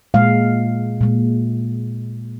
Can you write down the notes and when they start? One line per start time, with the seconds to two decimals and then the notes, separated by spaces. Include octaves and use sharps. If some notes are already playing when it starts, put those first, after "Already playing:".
0.14 A#2 G#3 F5
1.01 A#2 G#3